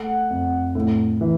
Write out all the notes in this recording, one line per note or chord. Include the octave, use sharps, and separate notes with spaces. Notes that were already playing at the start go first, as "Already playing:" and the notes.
Already playing: A3 F#5
F2
A2
E3